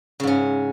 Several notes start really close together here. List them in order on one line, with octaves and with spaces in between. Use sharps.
C#3 G#2 C#4